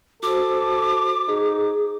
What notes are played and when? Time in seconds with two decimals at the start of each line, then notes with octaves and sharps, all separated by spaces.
0.23 F#4 A4 C5 D6
1.28 D#4 G#4